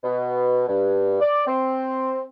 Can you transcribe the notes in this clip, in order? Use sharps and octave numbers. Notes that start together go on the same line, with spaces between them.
B2
G2
D5
C4